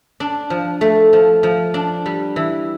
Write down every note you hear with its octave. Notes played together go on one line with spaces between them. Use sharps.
D4
F3
A3
F3
F3
D4
G3
E3